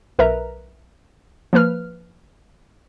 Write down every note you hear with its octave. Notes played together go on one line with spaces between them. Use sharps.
B1 A#4 B4 E5 A#5
F3 A#3 B4 F6